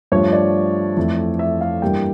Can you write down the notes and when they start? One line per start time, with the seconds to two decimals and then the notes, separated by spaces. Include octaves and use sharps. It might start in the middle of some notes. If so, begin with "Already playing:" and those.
0.12 G2 F3 A3 C#5
0.33 D5
0.97 F2 E3 A3
1.39 E5
1.61 F5
1.82 G2 E3 G3 A#3 G5